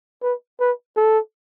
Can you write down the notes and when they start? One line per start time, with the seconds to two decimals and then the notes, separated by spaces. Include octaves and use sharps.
0.23 B4
0.60 B4
0.97 A4